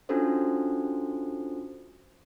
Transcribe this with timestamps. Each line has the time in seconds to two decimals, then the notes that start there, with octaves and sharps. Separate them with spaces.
0.09 C#4 D4 F4 F#4 A4 C5